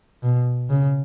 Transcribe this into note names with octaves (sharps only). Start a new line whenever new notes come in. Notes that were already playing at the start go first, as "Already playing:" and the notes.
B2
C#3